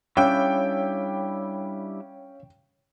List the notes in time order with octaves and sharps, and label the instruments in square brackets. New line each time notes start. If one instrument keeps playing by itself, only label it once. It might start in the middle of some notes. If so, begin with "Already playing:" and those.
[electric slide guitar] G3 D4 E4 [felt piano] C#4 [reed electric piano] C#5 F5 E6 [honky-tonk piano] G5